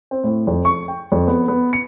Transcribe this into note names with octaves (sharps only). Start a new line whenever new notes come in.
C4
A2
F2
C#6
G5
F2
B3
B3
C#7